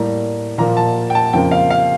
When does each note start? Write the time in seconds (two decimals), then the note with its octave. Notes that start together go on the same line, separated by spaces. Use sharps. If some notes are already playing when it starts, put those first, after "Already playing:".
Already playing: A2 G3 A#3 A#5
0.58 A#2 F3 A#3 A#5
0.77 A5
1.10 G5
1.15 A5
1.33 F2 C#3 F3 A#3 G5
1.51 F5
1.70 F5